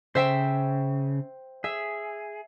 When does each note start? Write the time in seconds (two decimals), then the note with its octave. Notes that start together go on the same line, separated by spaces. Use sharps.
0.15 C#3 C5 E5 G5
1.64 G#4 E5